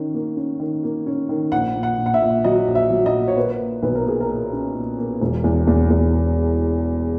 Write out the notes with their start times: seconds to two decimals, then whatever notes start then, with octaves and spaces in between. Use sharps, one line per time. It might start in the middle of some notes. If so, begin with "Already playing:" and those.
Already playing: D#3 C#4
0.14 A#3
0.37 C#4
0.60 D#3
0.83 A#3
1.07 C#4
1.29 D#3
1.52 A#1 F#5
1.75 A#2
1.83 F#5
1.98 A#2
2.06 F#5
2.14 E5
2.22 A#2
2.44 F#3 D#5
2.68 A#1
2.75 E5
2.90 F#3
3.06 D#5
3.14 A#2
3.28 C#5
3.36 A#3 B4
3.60 A#2
3.82 B1 B4
3.95 A#4
4.06 A#3 G#4
4.21 A#4
4.29 A#2
4.53 C#4
4.75 A#2
4.98 A#3
5.21 E1
5.44 E2
5.67 E2
5.90 E2